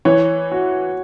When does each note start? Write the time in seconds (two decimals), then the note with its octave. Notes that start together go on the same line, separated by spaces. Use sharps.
0.05 E3 C#5
0.52 F#4